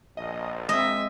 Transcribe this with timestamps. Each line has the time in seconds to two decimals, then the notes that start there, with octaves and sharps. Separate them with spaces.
0.17 A#1 D#5
0.69 G#3 C4 D#5 E5